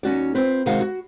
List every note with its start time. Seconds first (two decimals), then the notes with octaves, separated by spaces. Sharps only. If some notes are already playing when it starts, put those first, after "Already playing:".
0.03 D#2 C#4 F#4 D5
0.35 C4 F4 B4
0.66 C3 D#3 G#3 D#4 F#4 F5
0.81 F#4